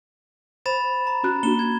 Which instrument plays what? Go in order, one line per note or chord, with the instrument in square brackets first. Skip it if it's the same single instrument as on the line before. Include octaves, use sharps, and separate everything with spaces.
[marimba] C5 [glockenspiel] B5 A6 E7
[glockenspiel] A#5
[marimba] C#4 F#4 F#6
[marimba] A#3 D4 F#4 [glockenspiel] E7 G7
[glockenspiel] G#6